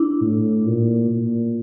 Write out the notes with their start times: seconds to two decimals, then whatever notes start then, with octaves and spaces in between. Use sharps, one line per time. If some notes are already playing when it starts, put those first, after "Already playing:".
Already playing: D4 E4
0.21 A2
0.66 A#2
1.10 A#2